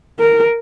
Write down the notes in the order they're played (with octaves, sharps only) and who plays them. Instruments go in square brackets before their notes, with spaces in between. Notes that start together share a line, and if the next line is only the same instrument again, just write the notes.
[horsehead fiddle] A#4